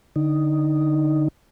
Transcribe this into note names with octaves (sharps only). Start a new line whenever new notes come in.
D3 D#4